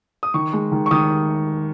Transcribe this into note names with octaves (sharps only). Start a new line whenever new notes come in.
D#6
D#3 C#6
G#3
D#3
C#6
D#3 D#6